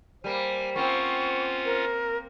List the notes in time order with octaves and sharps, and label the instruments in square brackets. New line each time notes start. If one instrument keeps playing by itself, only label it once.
[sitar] G3 A#3 [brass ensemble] C5 [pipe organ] G#5
[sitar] A#3 C4 [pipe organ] C#4 F4 F#5 [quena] C#6
[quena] A#4